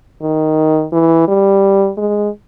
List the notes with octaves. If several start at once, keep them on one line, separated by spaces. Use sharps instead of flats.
D#3
E3
G3
G#3